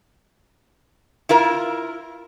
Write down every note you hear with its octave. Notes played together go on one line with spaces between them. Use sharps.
E4 F4 A#4